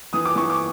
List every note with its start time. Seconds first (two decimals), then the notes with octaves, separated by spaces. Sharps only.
0.13 E3 D#6
0.25 D6
0.36 E3 C#6
0.50 D6